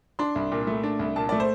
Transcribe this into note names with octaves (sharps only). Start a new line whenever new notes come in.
D4 C6
C2
A#2
A3
D4
C2
A#2 A5
A3 D5
C5